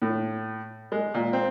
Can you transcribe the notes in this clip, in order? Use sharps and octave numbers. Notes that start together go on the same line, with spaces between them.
A2
G#3
A#2
C4